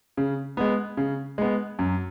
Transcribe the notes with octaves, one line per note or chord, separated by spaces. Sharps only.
C#3
G#3 B3
C#3
G#3 B3
F#2